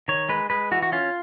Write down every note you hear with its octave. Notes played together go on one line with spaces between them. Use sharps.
D#3 C#5
G#3 B4
G#3 B4
E3 F#4
F#4
C#4 F4